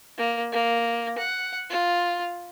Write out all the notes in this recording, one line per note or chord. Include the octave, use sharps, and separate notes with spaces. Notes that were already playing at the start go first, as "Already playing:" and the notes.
A#3
A#3
F#5
F4